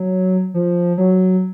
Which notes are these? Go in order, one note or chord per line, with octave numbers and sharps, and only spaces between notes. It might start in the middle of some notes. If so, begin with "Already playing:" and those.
Already playing: F#3
F3
F#3